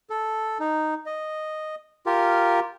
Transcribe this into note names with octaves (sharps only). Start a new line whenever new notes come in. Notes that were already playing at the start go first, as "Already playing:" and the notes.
A4
D#4
D#5
F4 G4 A#4